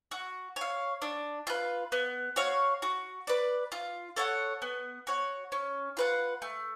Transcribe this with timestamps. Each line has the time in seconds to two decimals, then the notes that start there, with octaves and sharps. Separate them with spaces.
0.11 F#4
0.56 C#5 F5
1.02 D4
1.47 F4 B4
1.92 B3
2.36 F#4 C#5 F5
2.82 F#4
3.27 B4 D5
3.72 F4
4.17 A4 C#5 F#5
4.62 B3
5.07 F#4 C#5
5.52 C#4
5.97 F4 B4 F#5
6.42 A3